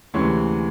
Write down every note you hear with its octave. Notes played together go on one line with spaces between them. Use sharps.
D2 C3 E3 G#3 C#4